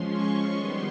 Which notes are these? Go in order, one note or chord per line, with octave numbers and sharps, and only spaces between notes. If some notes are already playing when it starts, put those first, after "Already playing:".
Already playing: F3 G#3 C#4 C6
C#6
D#3 G3 B3 C6